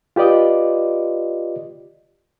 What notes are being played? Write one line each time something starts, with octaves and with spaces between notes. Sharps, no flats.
F4 G4 B4 D5 D#5